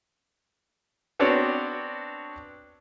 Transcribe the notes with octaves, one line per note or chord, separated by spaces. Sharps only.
B3 C4 D4 F#4 C#5